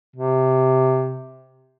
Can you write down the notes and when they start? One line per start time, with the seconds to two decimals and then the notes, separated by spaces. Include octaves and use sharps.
0.16 C3